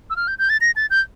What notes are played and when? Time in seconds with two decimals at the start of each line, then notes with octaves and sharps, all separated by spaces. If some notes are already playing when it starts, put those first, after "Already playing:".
0.10 E6
0.16 F6
0.28 G6
0.39 G6
0.50 A6
0.61 A#6
0.76 A6
0.90 G6